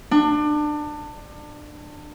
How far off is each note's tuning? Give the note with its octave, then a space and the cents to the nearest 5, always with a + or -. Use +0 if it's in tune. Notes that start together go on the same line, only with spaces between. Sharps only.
D4 +25